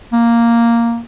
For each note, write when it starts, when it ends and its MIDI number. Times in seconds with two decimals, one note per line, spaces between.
0.13 1.00 58